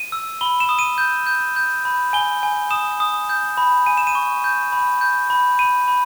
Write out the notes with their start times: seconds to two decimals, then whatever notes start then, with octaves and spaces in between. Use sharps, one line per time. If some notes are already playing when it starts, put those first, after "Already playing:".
Already playing: D#7
0.12 E6
0.41 B5 G7
0.60 E7
0.69 D#6
0.79 D#7
0.98 G6
1.27 G6
1.56 G6
1.85 B5
2.13 G#5 G7
2.43 G#5
2.71 D#6 E7
3.00 D#6
3.29 G6
3.57 B5
3.86 G#5 D#7
3.97 E7
4.07 D#7
4.15 C#6
4.44 G6
4.72 B5
5.01 G6
5.30 B5
5.59 B5 D#7
5.88 B5